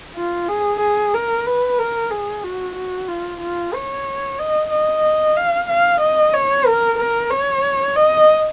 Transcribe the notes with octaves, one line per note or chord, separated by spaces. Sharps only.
F4
G#4
G#4
A#4
B4
A#4
G#4
F#4
F#4
F4
F4
C#5
D#5
D#5
F5
F5
D#5
C#5
A#4
A#4
C#5
D#5